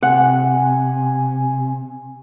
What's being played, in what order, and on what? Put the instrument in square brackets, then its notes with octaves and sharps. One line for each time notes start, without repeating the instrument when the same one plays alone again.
[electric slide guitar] C3 [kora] F#5 [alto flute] G#5